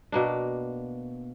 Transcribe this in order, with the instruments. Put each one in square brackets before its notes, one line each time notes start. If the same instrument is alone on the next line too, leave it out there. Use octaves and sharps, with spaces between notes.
[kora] B2 A#3 D4